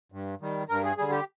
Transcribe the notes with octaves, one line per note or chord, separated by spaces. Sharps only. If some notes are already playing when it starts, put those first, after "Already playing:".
G2
D#3 G3
G2 A#4
G#4
D3 G3 G#4
G4